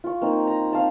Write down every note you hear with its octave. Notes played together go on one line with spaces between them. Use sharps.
F4 C#6
A#3 C4 D#4
A#5
C4 F5 A5